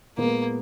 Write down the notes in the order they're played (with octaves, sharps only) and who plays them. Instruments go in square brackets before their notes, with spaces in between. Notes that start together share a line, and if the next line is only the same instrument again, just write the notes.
[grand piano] A#2 G#3 B3 [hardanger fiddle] A#3